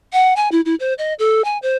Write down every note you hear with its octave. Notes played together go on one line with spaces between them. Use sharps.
F#5
G#5
E4
E4
C5
D#5
A4
G#5
C5